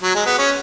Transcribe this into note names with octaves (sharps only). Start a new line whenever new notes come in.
F#3
G#3
B3
C#4